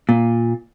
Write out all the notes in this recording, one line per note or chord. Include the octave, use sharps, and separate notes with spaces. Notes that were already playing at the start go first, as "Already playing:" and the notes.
A#2